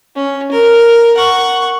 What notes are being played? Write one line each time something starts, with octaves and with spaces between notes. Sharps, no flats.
C#4
A#4
F#5 C#6